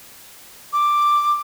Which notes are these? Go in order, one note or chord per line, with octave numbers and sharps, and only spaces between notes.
D6